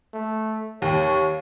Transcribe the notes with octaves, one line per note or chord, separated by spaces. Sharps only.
A3
D#2 C#5